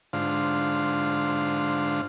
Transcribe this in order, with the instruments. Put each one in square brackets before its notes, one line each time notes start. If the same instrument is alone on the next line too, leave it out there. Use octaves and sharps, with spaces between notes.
[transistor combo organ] G#2 D3 D4 F4 C5 F5